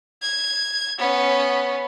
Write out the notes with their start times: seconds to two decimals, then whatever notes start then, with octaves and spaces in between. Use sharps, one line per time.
0.22 G#6
0.98 B3 C#4